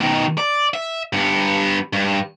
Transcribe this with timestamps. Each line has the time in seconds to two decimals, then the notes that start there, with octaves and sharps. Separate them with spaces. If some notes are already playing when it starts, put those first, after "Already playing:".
0.01 B2 D#3
0.38 D5
0.74 E5
1.13 G2 B3
1.93 G2